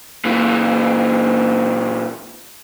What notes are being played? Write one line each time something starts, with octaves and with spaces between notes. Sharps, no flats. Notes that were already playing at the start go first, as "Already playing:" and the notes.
A#2 E3